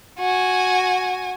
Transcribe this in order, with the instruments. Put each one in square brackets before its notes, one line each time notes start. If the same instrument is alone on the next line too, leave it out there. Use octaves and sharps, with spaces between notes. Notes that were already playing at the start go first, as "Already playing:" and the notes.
[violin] F#4 G#5